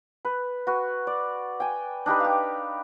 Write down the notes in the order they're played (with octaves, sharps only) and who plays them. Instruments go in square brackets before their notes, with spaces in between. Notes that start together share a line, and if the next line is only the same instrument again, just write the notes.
[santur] B4
F#4 B4
D5
G5 G#5
D4 D#4 G4 B4
G4 F5